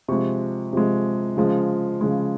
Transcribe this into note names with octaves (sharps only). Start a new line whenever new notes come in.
C3 F3 G#3 C#6
C3 F3 G#3
C#3 F3 G#3
C#3 F3 G#3